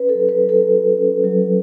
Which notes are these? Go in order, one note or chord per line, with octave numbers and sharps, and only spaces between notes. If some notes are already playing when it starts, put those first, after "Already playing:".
Already playing: C#4 B4
A4
F#3
B4
F#3
A4
F#4
C#4
F#3